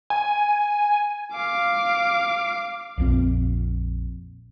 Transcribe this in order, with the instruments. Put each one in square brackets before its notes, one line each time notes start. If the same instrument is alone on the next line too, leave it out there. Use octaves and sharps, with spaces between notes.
[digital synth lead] G#5
[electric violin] F5 D6
[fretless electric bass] A#1 F2 C4